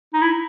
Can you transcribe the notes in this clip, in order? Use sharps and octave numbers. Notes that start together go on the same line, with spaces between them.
D#4
E4